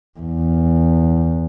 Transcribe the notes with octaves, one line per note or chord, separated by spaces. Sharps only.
E2